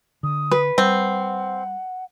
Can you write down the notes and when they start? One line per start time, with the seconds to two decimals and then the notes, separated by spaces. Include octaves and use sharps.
0.23 D3 D#6
0.51 B4
0.78 G3 C4 F#5